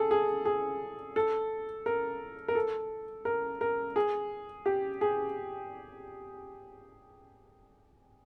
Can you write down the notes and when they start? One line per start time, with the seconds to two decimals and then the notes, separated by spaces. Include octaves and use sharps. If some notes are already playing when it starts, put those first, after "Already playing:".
Already playing: G#4 A4
0.11 G#4
0.45 G#4
1.16 A4
1.86 A#4
2.48 A#4
2.55 A4
3.25 A#4
3.61 A#4
3.96 G#4
4.66 G4
5.01 G#4